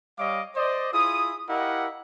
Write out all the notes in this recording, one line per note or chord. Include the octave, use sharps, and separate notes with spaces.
G3 C#5 D#5 F5 D6
C5 D5 D#5
E4 F4 G#4 D#6
E4 G4 A#4 D#5 F5 F#5